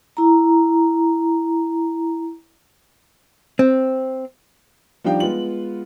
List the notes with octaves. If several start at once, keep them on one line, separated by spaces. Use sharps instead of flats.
E4 A#5
C4
F3 G3 D4 D#4 F5 G5
G#3 B3 F4 F#7